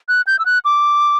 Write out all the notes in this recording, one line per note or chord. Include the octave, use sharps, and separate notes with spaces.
F#6
G6
E6
F#6
D6